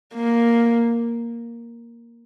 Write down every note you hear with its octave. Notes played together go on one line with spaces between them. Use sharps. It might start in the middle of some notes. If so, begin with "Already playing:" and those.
A#3